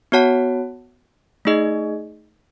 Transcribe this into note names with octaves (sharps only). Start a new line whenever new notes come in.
B3 F#4 C#5 F#5 A5
A3 D#4 G#4 D#5